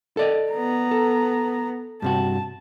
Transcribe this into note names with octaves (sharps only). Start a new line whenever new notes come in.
A4 D5 D#5
B3 A#5
A4
G2 C3 F#4 A5